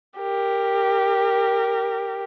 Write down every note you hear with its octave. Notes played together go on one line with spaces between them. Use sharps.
G4 A#4